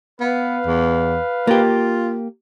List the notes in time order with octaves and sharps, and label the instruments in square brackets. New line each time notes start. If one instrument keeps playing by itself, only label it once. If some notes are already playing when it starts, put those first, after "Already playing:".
[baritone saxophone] B3 [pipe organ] B4 F5
[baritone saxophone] E2
[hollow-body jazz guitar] A#3 G4 [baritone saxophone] F4